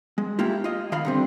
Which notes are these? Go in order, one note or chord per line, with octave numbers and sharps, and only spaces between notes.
G#3
A3 A#3 E4 F4 G4
F4 D#5
D#3 F5 B5
D3 G3 C4